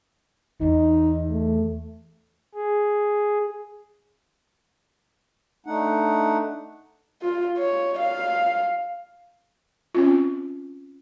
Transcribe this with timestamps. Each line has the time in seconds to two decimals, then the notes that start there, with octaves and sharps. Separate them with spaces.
0.61 E2 D#4
1.30 A3
2.55 G#4
5.66 A3 D4 D#4 F#5
7.22 F4
7.58 C#5
7.99 F5
9.95 C4 C#4 F4